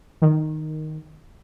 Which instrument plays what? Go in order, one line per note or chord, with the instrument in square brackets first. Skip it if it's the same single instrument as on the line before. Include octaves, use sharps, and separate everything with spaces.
[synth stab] D#3